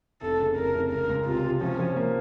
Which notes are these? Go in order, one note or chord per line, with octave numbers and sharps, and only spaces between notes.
F1 A4
C#3
F1 A#4
F1
C#2 A#4
C#2
C3 F4
C3
F3 C#4
F3
A#3